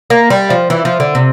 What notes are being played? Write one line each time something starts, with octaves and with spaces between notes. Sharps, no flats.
A#3
G3
F3
E3
F3
D3
C3